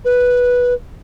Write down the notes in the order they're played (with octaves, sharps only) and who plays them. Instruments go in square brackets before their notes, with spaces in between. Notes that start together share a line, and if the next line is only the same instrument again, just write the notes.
[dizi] B4